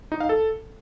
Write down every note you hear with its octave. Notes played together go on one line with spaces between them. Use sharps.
D#4
F5
A4